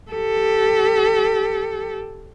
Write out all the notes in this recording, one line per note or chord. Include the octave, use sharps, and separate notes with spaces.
G4 A4